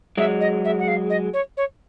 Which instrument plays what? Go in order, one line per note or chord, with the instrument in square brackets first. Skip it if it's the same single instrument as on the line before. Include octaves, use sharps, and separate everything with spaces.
[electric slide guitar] F#3 G#3 [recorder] E5
[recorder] D#5
E5
F#5
F5
D#5
C#5
C#5